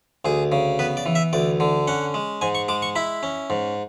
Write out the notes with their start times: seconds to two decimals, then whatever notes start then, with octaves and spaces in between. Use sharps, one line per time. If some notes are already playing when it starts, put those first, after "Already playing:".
0.25 D2 G#4
0.52 C#3
0.79 B3 B4
0.97 D5
1.06 E3
1.15 E5
1.33 D2 D5
1.60 D3
1.88 C#4 F#5
2.14 G#3
2.41 G#2 G#5
2.55 C#6
2.68 G#3 D6
2.82 C#6
2.96 E4 B5
3.23 C#4
3.50 G#2